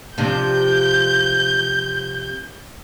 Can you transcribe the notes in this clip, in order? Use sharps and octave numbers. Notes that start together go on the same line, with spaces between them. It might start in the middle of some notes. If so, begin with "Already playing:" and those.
C3 F3 D4 G6